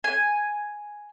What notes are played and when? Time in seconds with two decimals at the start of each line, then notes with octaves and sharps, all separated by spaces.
0.04 G#5